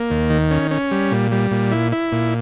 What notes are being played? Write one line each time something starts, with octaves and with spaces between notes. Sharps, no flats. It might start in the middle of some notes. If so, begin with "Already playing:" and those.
Already playing: A#3
D#2
D#3
C#4
C#4
G3
A#2
G3
A#2
E4
E4
A#2